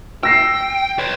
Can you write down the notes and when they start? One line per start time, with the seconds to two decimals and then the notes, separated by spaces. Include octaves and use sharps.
0.23 G5 E6 A#6 C7
0.99 B4 C#5